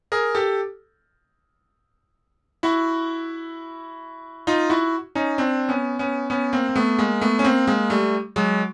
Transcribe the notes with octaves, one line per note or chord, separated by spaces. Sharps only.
G#4 A#4
G4 A4
E4 F#4
D#4 F4
E4 F#4
C#4 D#4
C4 D4
B3 C#4
B3 C#4
B3 C#4
A#3 C4
A#3
A3 B3
G#3 A#3
A3 B3
C#4
A#3 C4
G#3 A#3
G3 A3
F#3 G#3